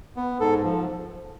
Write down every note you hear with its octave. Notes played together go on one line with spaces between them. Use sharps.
B3
G#2 A4
F3